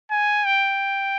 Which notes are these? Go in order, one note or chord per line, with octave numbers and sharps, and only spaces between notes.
G#5
G5